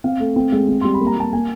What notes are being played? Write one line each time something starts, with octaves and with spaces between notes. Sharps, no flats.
C4 F5
A3
C4
G#3
C4
G3 C6
B5
A#3
A#5
G3 A5
A#3 G#5